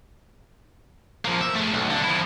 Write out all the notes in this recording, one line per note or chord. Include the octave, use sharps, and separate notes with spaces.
F3 A#3
E5
A3 G#4
B1
D3
F3 E4